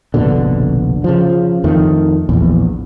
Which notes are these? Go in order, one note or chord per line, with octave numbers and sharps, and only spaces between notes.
F1 A#1 B2 D3
C#3 F3
F2 D#3 A3
A#1 E2